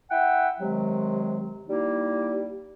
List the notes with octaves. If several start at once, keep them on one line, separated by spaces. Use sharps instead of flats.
E4 E5 F#5 G5
C3 D#3 F#3 G#3
G3 A#3 D#4 E4